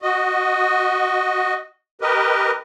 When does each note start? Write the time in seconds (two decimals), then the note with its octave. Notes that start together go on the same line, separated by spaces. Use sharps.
0.02 F#4 D#5
2.01 G4 A#4 B4 D#5